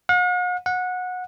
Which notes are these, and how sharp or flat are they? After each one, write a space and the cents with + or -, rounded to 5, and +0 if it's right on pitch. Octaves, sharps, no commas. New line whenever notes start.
F#5 -45
F#5 -20